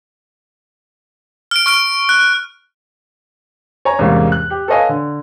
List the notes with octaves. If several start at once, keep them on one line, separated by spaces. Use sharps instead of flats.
F6 D7
C#6 F6 D7
F#6
C#5 G#5 A#5
E2 G#2 C3 G3 A#3 C#4
F#6
G4
A4 B4 C#5 D#5 F5 G#5
D3